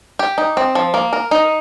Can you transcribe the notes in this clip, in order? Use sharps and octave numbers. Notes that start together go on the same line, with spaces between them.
G4
D#4
C4
F3
A#3
A#4
D#4